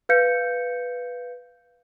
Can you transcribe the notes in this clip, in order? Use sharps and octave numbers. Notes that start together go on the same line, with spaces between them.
B4 F5 G6 C#7